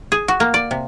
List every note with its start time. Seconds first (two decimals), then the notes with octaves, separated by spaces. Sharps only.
0.12 G#4
0.28 F#4
0.40 A#3
0.54 D5
0.71 C3